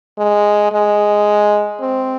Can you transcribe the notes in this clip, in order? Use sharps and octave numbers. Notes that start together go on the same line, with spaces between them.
G#3
G#3
C4